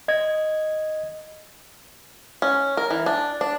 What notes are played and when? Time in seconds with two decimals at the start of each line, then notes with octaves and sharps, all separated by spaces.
0.08 D#5 G#6
2.42 C#4
2.77 A#4
2.91 E3
3.06 D4
3.41 D4